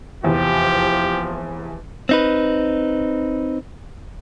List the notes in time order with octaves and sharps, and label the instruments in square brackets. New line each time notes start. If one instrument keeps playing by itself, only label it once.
[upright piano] F1 E2 [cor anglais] F3 [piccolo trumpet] G4
[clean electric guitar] C4 D#4 B4